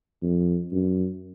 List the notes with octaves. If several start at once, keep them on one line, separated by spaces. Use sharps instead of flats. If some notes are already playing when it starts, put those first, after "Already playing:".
F2
F#2